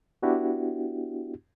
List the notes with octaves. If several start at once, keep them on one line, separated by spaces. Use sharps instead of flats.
B3 D4 E4 F#4 G4